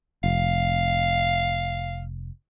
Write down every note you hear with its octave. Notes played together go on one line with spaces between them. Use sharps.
F1 F5